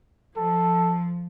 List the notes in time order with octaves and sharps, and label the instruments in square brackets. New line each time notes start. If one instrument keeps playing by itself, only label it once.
[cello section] F3 [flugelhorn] A4